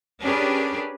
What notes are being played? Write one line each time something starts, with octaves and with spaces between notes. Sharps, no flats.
C#4 D4 G4 G#4 A#4 B4